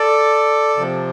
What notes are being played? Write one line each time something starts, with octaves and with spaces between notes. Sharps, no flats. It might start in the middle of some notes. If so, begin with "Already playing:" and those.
Already playing: A4 D5
C3 F3